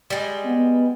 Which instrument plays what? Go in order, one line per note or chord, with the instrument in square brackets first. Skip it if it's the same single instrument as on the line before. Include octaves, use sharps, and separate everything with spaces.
[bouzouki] G3 G#3
[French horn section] B3